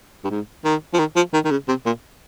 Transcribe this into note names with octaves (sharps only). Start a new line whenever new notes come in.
G2
G#2
D#3
F3
D#3
F3
D#3
D#3
C#3
C3
A#2